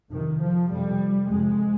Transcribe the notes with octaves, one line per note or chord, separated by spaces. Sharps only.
F2 C3 D#3
F3
F2 C3 G3
F2 C3 G#3